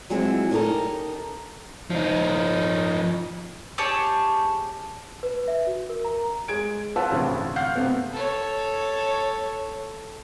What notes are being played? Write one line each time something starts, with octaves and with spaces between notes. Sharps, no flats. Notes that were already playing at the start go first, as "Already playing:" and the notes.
F3 F#3 G#3 C4 E4
C#4 D#4 G4 A4 A#4
F3 D#4
G4 G#4 C#5 A5
B4
E5
F#4
A#4
A#5
G#3 G#4 G#6 D7
F4 B4 F#5 A5 E6
A1 D2 C3
F5 F#5 F6 G6 C7
C3 A3 B3
A4 C#5